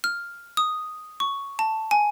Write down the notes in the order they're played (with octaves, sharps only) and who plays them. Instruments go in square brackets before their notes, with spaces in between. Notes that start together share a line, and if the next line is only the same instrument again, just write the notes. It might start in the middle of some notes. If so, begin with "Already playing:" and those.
[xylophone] F6
D#6
C#6
A5
G#5